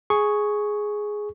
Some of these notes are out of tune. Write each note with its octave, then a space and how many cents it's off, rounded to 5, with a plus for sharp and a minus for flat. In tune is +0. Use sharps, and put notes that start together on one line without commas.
G#4 +5 C#6 +0